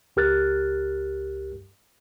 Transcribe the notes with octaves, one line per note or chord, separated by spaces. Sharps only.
C#2 G4 A#4 F6 F#6 A6